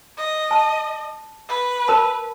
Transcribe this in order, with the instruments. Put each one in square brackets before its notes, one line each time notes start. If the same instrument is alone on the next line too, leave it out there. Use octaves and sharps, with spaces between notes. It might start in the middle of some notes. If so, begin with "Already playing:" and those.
[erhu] D#5
[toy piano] A5
[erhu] B4
[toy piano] A#4 A5 B5